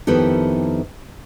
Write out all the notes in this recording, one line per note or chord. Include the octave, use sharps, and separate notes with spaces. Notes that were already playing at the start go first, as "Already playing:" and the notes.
F2 D#3 B3 E4 G4 A4